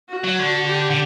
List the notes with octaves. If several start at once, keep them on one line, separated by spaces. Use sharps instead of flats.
F#4
F#3
D3
G4
D3